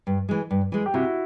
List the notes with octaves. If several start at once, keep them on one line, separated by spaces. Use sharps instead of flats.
G2
E3 G#3
G2
E3 G#3
G4
C3 E4 F#4